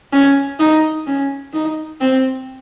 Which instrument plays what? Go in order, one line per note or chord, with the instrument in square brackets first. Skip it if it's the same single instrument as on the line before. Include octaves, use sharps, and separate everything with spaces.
[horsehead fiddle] C#4
D#4
C#4
D#4
C4